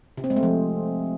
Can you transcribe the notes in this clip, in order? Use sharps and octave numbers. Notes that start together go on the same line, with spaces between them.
C3
C4
G#3
A3
F3